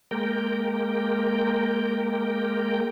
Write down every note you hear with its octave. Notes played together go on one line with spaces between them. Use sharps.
G#3 A#3 A#4 G5